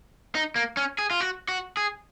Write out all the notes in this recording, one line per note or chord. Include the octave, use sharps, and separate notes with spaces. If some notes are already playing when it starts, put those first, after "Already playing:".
D#4
A#3
C#4
G#4
F4
F#4
F#4
G#4